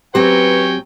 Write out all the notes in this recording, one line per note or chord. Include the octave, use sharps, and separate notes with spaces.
F#3 C4 G4 B4 G5 G#5 C#6